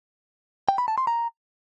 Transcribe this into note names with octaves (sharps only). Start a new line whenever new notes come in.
G5
B5
A5
C6
A#5